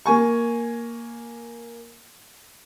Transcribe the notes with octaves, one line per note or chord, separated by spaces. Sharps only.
A#3 G#5 C#6